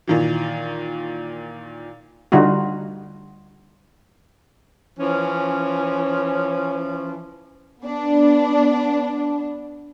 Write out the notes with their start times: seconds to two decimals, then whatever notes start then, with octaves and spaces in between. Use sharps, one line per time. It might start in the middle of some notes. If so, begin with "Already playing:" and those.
0.07 A#2 D#3 E3
2.32 D3 G3 D#4 F4 F#4
5.00 E3 F3 C#4
7.83 B3 D4